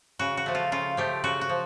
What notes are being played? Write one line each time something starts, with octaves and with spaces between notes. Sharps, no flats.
C#3 F#4
F#4
F3 A3
F4
C#3 F4
F3 A3 G4
C#3 F#4
F#4
F3